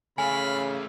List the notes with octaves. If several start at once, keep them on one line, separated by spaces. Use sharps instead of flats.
C#3 A3 C#4 F5 G#5 B5